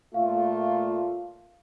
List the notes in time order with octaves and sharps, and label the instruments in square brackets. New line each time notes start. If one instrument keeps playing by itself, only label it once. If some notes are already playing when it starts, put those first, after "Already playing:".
[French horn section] A#2 A3 F4 [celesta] F5